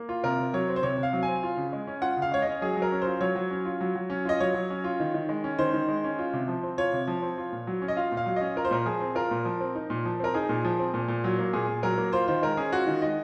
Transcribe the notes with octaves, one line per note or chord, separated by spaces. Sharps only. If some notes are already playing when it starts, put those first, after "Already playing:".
Already playing: A#3
F4
C3 A#4
C3
F#3 C#5
C4
C5
C3 C#5
C3
F5
F#3
C4 G#5
F4
C#3
G#3
C#4
F4 F#5
C#3
F5
G#3 C#5
C#4 D#5
F#3 G#4
F#3
A#4
C#4
F4 C5
F#3 C#5
F#3
C#4
F4
F#3
F#3
C#4
F4 D#5
F#3 C#5
F#3
C#4
F4
D#3
D#3
G#3
C#4
D#3 C5
D#3
G#3
C#4
F4
C3
F3
C4
F4 C#5
C3
F3
C4
F4
A#2
F#3
C#4
D#5
F4 F5
A#2
F5
F#3
C#4 D#5
F4 A#4
C5
A#2 A#4
F3 G#4
C4
F4 A#4
A#2
F3
C4
D#4
A#2
F3
C4 A#4
D#4 G#4
A#2
F3
C4
A#2
A#2
F#3
A#3
A#2 G#4
A#2
F#3 A#4
A#3
F4 C5
D#3 C5
G#3 A#4
C#4 G#4
F4 F#4
D#3
G#3 D#5